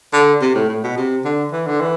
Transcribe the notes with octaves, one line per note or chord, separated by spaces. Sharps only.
D3
C3
A2
A2
B2
C3
D3
E3
D3
E3